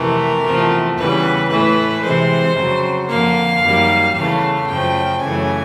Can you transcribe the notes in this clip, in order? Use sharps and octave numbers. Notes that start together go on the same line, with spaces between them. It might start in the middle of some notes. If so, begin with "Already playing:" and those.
Already playing: F2 C3 E3 A3 A#4
E2 C3 F3 A3
E2 C#3 E3 G3 B4
A2 E3 A3 B4
C3 E3 G#3 C5
F2 C#3 F#3
F2 D3 F3 A#3 F5
F#2 D#3 G3 A#3
E2 C#3 E3 A3 F5
F#2 C#3 F3 A3 G5
F#2 C#3 E3 A3 G#5